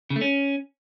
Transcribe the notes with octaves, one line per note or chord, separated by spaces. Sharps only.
C#3
A3
C#4